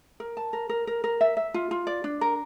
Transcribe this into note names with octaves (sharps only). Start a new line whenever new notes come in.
A#4
A5
A#4
A#4
A#4
A#4
E5
E5
F4
F4
D5
D4
A#4